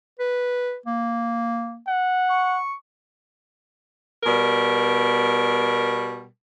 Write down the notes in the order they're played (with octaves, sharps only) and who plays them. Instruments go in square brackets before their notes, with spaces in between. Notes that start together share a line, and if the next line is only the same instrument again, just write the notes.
[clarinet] B4
A#3
[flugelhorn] F#5
[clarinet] C#6
[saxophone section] B2 G3 A#4